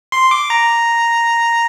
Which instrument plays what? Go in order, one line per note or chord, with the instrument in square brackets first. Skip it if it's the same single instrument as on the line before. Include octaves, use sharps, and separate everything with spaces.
[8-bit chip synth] C6
D6
A#5